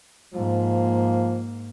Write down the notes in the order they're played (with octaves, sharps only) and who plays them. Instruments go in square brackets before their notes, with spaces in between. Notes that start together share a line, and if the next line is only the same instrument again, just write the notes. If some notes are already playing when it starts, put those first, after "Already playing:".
[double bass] G#2 A#3 [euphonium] F3